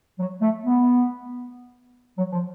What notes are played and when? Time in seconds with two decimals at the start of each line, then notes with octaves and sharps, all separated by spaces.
0.19 F#3
0.41 A3
0.64 B3
2.18 F#3
2.33 F3